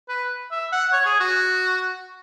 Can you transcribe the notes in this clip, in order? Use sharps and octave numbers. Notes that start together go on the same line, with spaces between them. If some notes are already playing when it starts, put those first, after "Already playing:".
B4
E5
F#5
C#5
G#4
F#4